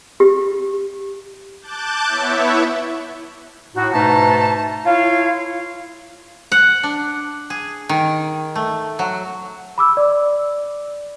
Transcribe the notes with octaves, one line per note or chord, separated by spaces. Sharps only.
G4
A5 D6 F#6 G6 A6
B3 E4 C#5 E5
A2 D#4 F#4
G#2 B2 A3 D#4 B4 A5
E4 F4 C#5 F5
F#5
D4
G#4
D#3
A3
F#3
B5 D6 E6
D5